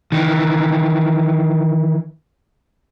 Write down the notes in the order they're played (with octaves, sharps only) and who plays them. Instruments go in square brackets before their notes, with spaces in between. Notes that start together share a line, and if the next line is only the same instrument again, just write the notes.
[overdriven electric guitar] D#3 E3